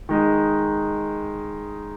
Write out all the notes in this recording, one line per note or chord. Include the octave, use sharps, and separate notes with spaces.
D#3 G#3 D#4